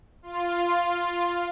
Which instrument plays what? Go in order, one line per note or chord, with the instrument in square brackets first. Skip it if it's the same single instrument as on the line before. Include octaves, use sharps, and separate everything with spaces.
[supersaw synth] F4